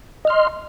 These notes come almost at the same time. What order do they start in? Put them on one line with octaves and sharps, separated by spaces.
D#5 F6 C6